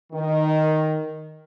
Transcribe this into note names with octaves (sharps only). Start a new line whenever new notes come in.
D#3